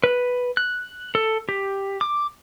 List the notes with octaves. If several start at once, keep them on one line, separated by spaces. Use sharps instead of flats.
B4
F#6
A4
G4
D6